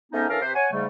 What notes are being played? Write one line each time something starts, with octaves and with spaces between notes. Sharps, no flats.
G#2 A3 B3 C#4 D#4
E3 C#4 D4 A4 A#4 F5
C3 B4 C5
C#5 F#5 G#5
G#2 C#3 G3 A3